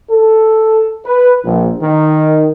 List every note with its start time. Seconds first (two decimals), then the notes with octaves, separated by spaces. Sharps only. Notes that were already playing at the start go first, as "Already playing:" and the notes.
0.10 A4
1.06 B4
1.44 A#1
1.82 D#3